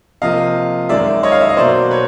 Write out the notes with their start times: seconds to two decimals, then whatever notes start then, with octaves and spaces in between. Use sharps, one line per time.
0.22 C3 F3 A#3 D#5 F5
0.89 F#2 D#3 G#3 D5 E5
1.23 C#5 D#5
1.32 F5
1.41 E5
1.49 D#5
1.57 B2 F#3 A#3 C5 D5
1.91 B4 C#5